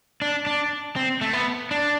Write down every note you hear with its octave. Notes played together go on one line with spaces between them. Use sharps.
D4
D4
C4
A3
B3
D4